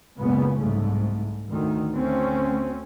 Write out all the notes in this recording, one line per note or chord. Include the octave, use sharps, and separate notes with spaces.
F#1 C#2 A#2 C#3 B3
C2 G#2 A3
D2 D#3
D2 A3 C4 C#4